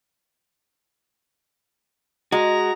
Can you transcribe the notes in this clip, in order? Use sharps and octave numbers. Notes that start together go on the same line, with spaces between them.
G#3 F#4 A#5